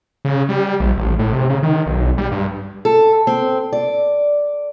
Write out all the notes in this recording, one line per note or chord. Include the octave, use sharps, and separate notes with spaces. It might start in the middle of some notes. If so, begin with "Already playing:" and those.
C#3
G3
A#1
A1
A2
C3
C#3
D#3
B1
G3
G2
A4
C4
D5